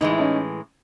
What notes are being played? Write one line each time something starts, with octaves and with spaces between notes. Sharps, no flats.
A2 E3 G#3 D#4
E4
C#4 D#4